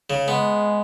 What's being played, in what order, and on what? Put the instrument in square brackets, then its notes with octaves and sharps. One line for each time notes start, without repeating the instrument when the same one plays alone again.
[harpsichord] C#3
[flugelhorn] G#3 [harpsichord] B3